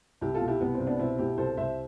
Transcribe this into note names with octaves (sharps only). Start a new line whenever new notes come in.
C2 E4 G4
F4 A4
B2
E4 G4
C2 B3
C4
C2
B3 D4
B2 C4 E4
B2 E4 G4
C2 A4 C5
C2 C5 E5